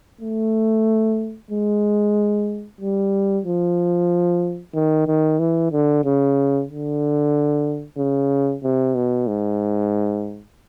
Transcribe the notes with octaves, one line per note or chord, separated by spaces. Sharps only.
A3
G#3
G3
F3
D#3
D#3
E3
D3
C#3
D3
C#3
C3
B2
G#2